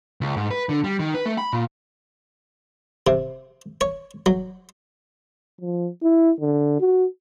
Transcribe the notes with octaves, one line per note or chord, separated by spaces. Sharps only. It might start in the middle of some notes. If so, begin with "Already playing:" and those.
C#2
G#2
B4
D3
G3
D#3
B4
A3
B5
A#2
C3
C#5
F#3
F3
E4
D3
F#4